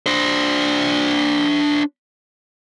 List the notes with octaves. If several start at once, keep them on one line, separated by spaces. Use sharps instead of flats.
D4 C5